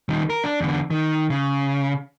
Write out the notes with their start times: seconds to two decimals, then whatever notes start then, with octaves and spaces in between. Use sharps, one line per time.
0.09 D#3 G3
0.30 A#4
0.44 D4
0.60 E2 D3
0.90 D#3
1.30 C#3